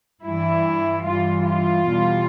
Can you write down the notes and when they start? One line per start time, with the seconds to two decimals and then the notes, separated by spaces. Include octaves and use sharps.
0.24 G2 E3 G3 E4
1.05 G2 E3 G3 F4
1.46 F4
1.86 E2 B2 G3